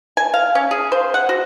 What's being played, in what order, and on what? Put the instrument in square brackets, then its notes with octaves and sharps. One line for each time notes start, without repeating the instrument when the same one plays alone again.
[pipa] G#5
F5
C#4
G#4
C5
F#5
F#4